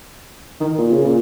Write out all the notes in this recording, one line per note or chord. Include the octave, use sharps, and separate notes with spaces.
D#3
A#2
C#3
A#2